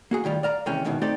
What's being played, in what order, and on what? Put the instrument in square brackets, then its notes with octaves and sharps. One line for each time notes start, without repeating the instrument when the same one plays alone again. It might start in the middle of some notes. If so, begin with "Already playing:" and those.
[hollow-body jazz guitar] A#3 F#4 G#4
A2 D#3 G3 F4
D5 F5 A#5
D#2 C3 E3 G#3 C#4 G5
E2 G#2 B2 D#3 E3
A3 C4 D#4 G4 A4 D5